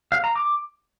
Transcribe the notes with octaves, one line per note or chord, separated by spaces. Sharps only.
F5
A#5
D6